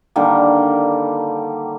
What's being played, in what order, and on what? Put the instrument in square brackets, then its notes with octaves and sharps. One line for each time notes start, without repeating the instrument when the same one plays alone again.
[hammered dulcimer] D3 D#3 G3 A#3